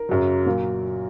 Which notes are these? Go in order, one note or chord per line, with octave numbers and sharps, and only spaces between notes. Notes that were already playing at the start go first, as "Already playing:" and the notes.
Already playing: A#4
F#2 C#3 F#3
A#2 F#3 A#3